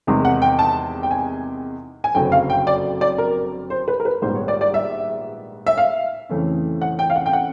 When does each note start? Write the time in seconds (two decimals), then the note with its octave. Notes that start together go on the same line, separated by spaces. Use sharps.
0.07 E2 C3 D#3 G#3
0.25 F#5
0.42 G5
0.59 A5
1.03 G5
1.11 G#5
2.04 G#5
2.15 F#1 F2 D3 F#3 G5
2.32 F5
2.50 G5
2.67 D5
3.01 D5
3.18 A#4
3.70 C5
3.88 B4
4.00 A#4
4.05 B4
4.22 A#1 G#2 D#3 G3 B3 C5
4.35 C#5
4.48 D5
4.61 D5
4.74 E5
5.67 E5
5.78 F5
6.29 F2 C#3 E3 A3 C#4
6.82 F#5
6.99 G5
7.10 F5
7.16 F#5
7.26 G5
7.33 F#5